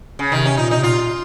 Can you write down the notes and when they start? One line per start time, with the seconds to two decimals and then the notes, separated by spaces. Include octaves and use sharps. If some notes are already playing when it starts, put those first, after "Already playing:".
0.19 C#3
0.32 C3 D#3
0.45 C#4
0.57 A#2 D#4
0.71 C3 D#4
0.83 A#2 F4